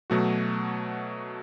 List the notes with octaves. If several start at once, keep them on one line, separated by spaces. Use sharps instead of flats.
B2 F#3 A3 F#4